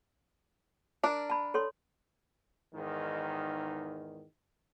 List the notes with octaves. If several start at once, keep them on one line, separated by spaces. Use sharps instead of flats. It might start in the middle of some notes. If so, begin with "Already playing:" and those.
D4 A#4 D6
A5 B5
A4 C#5 C6
E2 G#2 D#3